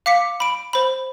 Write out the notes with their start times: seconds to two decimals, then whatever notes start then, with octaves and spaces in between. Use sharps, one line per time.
0.06 F5 D6 B6 C#7
0.40 B5 D7
0.73 C5 B5